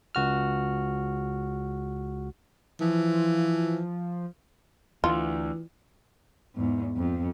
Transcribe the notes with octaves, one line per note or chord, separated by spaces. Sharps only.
C#2 F#4 F6
E3 F3
D2 E3 F4
E2 G#2
F2